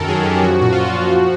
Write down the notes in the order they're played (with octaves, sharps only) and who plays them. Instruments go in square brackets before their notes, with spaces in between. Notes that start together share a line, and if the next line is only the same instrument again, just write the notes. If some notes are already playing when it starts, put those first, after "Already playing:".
Already playing: [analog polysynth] F#2 D#3 A4 A#4
F#3 G#4
F#2 G4
F3 F#4
A#2 F#4
F4
A#2
F#4
F3
F3